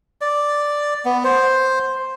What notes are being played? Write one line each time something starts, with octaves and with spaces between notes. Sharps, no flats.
D5
B3
C5